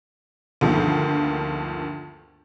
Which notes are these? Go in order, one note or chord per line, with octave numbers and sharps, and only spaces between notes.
D2 G2 D#3 F3 A#3 B3